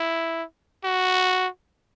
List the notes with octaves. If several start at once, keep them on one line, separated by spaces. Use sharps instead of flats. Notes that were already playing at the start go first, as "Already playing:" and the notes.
Already playing: E4
F#4